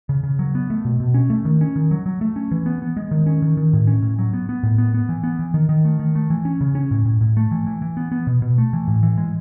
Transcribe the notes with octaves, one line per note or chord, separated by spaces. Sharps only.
C#3
C#3
F#3
B3
A3
B2
B2
C#4
A3
D#3
C#4
D#3
F#3
F#3
A3
C#4
E3
B3
B3
G#3
D#3
C#4
D#3
D#3
A2
C#4
A2
F#3
B3
B3
A2
B3
B3
E3
B3
E3
D#3
D#3
A3
D#3
A3
E3
C#4
C#3
C#4
A2
A2
A2
A3
E3
E3
E3
B3
B3
B2
B2
A3
E3
A2
E3
G#3